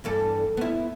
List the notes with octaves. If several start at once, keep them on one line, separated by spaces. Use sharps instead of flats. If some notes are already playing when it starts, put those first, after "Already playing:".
E2 G2 A4
B3 E4